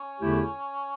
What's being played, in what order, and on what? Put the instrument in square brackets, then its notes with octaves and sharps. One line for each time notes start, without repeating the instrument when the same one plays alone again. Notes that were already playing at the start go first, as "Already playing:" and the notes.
Already playing: [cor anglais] C#4
[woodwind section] E2 D3 A3 E4 G4